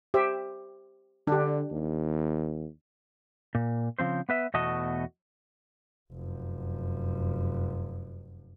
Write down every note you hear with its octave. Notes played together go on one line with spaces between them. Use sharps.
G4 C5 E5
D3 D4 G4
D#2
A#2
C#3 F3 C4 C5
B3 B4 E5
E2 B2 A3 F#4 D#5 A5
F1 F#2